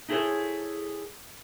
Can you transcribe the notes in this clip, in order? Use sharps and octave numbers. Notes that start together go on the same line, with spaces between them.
D#4 E4 G#4 A4 C5 C#5